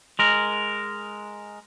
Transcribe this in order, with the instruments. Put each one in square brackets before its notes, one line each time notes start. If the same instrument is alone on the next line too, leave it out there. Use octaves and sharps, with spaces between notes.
[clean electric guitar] G#3 A#4